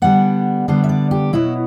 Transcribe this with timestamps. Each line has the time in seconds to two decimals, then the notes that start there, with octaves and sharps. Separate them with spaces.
0.02 D3 G3 B3 F#5
0.68 D3 G3 B3 C5
0.84 E5
0.89 D5
1.11 G4
1.33 B2 F#3 B3 E4